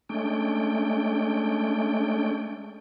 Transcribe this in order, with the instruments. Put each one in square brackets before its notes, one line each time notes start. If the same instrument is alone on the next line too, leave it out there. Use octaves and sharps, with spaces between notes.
[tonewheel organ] G#3 A3 C#4 D4 G5